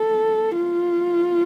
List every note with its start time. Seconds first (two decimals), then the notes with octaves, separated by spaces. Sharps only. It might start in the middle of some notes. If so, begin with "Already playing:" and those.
Already playing: A4
0.57 F4